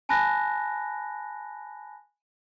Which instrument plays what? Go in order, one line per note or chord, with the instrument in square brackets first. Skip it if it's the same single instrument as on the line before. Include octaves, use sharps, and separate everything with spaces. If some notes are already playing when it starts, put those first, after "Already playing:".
[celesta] G#5 A5 B5 F#6 A#6